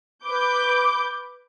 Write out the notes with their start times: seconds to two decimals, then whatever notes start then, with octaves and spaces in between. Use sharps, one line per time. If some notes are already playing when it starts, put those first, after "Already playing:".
0.25 B4 D6 G6